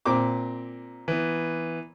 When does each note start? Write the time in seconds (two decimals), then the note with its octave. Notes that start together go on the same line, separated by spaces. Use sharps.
0.05 A#2 C4 D6
1.08 E3 B3